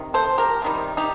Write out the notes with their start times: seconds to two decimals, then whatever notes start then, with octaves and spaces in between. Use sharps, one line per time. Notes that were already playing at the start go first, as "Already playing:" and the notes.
Already playing: C3 D#3
0.14 A4 C5
0.38 G4 A#4
0.62 C3 D#3 G3
0.97 D#4 G4